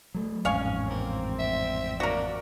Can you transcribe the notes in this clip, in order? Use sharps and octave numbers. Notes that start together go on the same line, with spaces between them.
F#3 A3
A1 F2 G#2 C#4 C#5 F5 G#5
A#3 C4
E5
A#3 F#4 A#4 D5